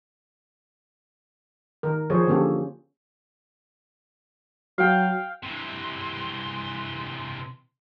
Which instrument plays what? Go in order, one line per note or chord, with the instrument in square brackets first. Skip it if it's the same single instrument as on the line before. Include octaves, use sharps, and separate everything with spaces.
[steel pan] D#3 A#4
F3 G#4 C5 C#5
D3 A#3 C#4 G4 A4
[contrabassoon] F#3 [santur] F5 G5
[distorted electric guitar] C3 E3 [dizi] C6